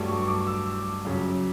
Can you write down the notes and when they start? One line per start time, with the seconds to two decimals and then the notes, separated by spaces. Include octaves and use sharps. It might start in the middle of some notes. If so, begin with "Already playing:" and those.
Already playing: G2 F#3 A3 D6
0.08 C#6
0.28 D6
0.47 E6
1.05 F#2 C#3 F#3